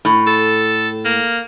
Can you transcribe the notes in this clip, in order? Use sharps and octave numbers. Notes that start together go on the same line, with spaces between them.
A2
A4
A#3